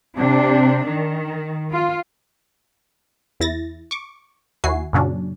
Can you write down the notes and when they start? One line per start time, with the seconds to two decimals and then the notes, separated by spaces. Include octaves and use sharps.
0.16 C3 D4
0.84 D#3
1.71 F4
3.40 E2 E4 A6 A#6
3.91 C#6 D6
4.64 D#2 E4 F#4 G#5 C7
4.93 F#2 A#2 C#3 F#3 C#4 D4